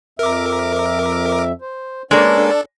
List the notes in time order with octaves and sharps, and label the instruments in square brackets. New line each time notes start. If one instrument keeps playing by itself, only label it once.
[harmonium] F2 E5 [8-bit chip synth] A#4 D6
[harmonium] C5
[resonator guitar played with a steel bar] G#3 A#3 [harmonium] B3 C#4 [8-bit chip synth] D4 A4 [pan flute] D5